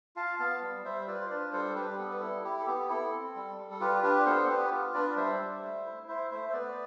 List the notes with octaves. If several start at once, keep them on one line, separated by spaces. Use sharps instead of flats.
F4 F5 A5
B3 F5 A5
G3
G3 C5 E5
E5
F4 B4 D5
C5
D4 B4 D5
G3 A4 C5
G3 G4 B4
B3 A4
B4
E4 A4
E4 G4
A4
B3 G4
E4 A4
C4
G3
G3
A4
F4 G4 B4
D4 G4 B4
B3 A4 C5
B3 G4 B4
F4
D4 B4 D5
G3 C5 E5
G3
A3
E4
E4 C5 E5
A3 C5 E5
C5
B3 B4 D5